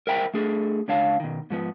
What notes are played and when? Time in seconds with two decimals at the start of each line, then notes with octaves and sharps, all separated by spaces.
0.07 A#4 C5 E5 G5 A#5 B5
0.34 A3 D4 G#4 A4
0.88 C#2 D4 C#5 F5 A5
1.20 B2 D#3
1.50 G#2 F3 B3